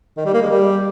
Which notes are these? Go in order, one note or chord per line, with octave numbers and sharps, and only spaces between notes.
D#3
G3
A#3
G#3
G3